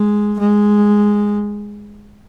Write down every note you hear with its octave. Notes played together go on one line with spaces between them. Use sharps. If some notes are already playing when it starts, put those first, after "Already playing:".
Already playing: G#3
G#3